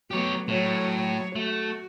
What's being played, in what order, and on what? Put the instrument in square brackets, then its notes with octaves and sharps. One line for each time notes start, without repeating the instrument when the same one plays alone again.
[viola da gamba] F#3 A3 B3 [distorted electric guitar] G4 C#5
[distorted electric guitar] A2 [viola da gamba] F#3 C#5
[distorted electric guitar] A3 [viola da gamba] F#4